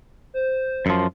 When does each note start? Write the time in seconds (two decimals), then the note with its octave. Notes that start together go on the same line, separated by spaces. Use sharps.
0.34 C5
0.86 F#2 F3